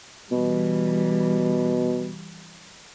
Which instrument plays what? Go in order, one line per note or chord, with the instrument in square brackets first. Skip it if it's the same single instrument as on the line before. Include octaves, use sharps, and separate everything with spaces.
[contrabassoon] B2 [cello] E3 G3